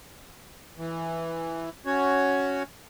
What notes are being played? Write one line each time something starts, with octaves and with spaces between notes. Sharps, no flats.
E3
C#4 F#4 C#5